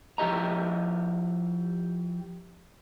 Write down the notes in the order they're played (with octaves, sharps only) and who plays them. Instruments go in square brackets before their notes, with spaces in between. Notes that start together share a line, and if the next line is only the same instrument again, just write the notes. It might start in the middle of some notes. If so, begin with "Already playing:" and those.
[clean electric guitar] F3 E4 G4 D#5 A#5